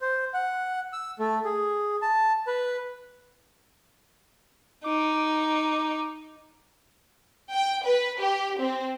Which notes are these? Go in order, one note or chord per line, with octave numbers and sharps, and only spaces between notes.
C5
F#5
E6
A3
G#4
A5
B4
D#4 D6
G5
B4
G4
C4